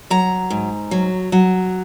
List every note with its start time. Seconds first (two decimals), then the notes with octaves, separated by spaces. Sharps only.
0.10 F#3 A#5
0.50 G#2
0.91 F#3
1.32 F#3